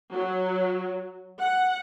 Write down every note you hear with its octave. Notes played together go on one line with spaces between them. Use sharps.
F#3
F#5